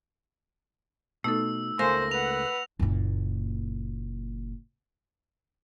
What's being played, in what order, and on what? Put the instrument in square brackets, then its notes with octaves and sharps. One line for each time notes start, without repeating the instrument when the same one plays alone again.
[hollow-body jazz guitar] B2 [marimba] A3 D#4 A4 [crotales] E6
[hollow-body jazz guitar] C#2 A3 A#3 [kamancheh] C5 [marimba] F5 G#5 C6 [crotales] A#6
[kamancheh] B4 F#5 [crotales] F7
[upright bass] F#1 A#2